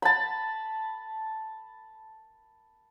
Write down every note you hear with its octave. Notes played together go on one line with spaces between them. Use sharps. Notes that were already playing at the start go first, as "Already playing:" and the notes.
A5 B5